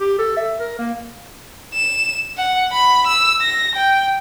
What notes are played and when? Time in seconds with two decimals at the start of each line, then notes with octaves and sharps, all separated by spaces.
0.01 G4
0.19 A4
0.37 E5
0.60 A#4
0.79 A#3
1.74 E7
2.37 F#5
2.73 B5
3.07 E6
3.42 A#6
3.76 G5